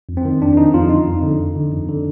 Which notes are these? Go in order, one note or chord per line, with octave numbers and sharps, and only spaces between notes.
F2
C4
D#3
F2 D4
D#3 D#4
F2 F4
D3 D#4
F2
D3
F2
D3
F2
D3